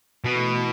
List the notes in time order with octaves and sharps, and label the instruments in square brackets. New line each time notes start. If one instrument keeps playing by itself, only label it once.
[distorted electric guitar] B2 [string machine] E3 A3 E4 B4